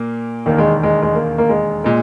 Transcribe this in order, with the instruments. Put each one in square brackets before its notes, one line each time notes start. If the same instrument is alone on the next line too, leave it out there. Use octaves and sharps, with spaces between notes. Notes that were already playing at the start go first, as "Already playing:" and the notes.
Already playing: [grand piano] A#2 A#3
[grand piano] E1 D#2 D#3 [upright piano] A#3
[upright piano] G#3
G#3
G#3
A#3
A#3
G#3
[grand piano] A#2 [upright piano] G#3